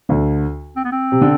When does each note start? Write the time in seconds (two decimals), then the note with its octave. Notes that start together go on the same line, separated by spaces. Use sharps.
0.09 D2 D3
0.76 C4
0.85 B3
0.92 C4
1.12 C3
1.21 D3